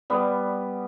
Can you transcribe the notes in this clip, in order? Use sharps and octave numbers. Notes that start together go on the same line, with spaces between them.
G3 B3